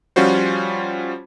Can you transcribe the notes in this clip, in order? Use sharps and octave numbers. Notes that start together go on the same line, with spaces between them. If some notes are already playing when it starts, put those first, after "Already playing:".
F3 G3 C#4 F4 F#4 C5